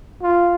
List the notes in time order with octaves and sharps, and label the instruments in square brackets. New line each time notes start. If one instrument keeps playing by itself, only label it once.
[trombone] F4